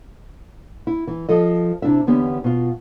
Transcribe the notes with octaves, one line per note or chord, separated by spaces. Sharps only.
E4
E3
F3 A4 D#5
C3 D4 E4 E5
E2 D3 B3 C#4 D4 G4
B2 F4